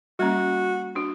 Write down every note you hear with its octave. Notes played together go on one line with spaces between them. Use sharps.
G3 A#3 C#4 F#4
D4 F#4